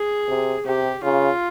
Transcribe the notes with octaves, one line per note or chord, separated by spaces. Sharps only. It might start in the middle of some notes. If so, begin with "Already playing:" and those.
Already playing: G#4
C3
C3 G4
C#3 F4